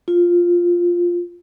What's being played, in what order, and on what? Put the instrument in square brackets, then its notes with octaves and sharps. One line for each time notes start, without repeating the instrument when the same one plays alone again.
[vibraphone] F4